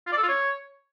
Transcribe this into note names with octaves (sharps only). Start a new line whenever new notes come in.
F4
D5
A4
F4
C#5